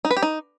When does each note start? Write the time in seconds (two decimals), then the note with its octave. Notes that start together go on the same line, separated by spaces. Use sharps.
0.05 D#4
0.11 B4
0.17 G4
0.23 D#4